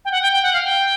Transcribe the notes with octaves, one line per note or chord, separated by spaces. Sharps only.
G5
F#5
G5
G5
F#5
F5
G5